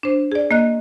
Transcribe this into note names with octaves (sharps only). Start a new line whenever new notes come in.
D4 C5
G#4 D5
A#3 D#5 F#6